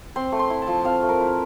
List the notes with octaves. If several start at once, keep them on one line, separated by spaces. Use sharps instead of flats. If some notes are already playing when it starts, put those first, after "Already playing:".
C4 C6
A3
C6
E4
A5
F3
C4 F5
A3
A#4
E4